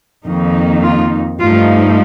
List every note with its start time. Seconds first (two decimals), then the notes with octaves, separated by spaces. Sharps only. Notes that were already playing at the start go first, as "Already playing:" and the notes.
0.24 F2 D#3 A#3 D#4
0.82 F4
1.39 G2 F3 A3 D#4 F4